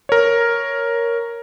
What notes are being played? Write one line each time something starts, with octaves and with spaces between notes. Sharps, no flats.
A#4 C#5